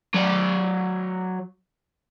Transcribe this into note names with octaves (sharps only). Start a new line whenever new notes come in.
F#3 D5